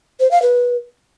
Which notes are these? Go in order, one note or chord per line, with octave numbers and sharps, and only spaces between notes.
C5
F5
B4